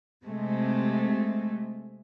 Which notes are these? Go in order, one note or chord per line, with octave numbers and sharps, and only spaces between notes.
C3 G#3 A3